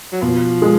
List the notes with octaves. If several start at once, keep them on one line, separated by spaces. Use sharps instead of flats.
F#3
B2 F3
G#3